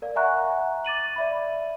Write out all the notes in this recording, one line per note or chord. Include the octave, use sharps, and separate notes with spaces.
A#4 D5 F5
E5 F#5 G#5 A#5 C#6 F#6
D6 A6 D#7 F#7
D5 E5 B5